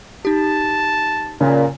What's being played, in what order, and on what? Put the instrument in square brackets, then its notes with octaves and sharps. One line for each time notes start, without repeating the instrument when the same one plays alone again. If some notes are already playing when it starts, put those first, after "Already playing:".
[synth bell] D#4 G4 [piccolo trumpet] A5
[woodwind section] A#2 [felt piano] C#3